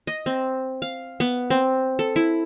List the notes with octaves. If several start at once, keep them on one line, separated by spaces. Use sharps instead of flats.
D#5
C4
F5
B3
C4
A4
E4